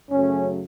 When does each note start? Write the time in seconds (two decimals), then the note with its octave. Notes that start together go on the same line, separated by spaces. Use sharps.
0.10 F#2 C#3 F#3 A3 C#4